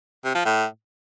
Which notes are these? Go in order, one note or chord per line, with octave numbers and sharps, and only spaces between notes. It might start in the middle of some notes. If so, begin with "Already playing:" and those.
C3
F3
A2